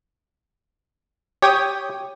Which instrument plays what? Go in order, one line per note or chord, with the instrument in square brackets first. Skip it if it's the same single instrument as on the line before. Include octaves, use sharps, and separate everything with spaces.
[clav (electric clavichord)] G4 [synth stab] C#5 G5 D#6